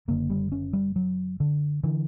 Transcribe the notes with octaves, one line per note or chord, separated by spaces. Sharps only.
F#1 F#2 D3 A#3
G3
C#4
G3
F#3
D3
D3 E3